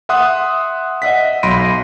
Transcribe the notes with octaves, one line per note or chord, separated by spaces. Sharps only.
E5 F#5 C6 D#6 F#6
D#5 E5 F#5 B6
B1 B5 C6 A#6 D7 D#7